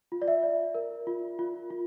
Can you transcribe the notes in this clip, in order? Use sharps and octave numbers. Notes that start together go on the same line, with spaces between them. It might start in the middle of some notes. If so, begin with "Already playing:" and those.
F4
D5
E5
D5
A#4
F4
F4
F4